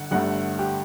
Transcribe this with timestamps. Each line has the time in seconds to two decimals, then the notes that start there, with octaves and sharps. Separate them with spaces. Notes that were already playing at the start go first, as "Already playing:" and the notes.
Already playing: G1 D3 F#5
0.11 G1 G2 D3 A3 F#5
0.59 G4